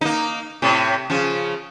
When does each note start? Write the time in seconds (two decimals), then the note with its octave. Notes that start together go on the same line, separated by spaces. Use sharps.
0.01 A#3 D#4
0.62 A2 C3
1.10 C#3 F3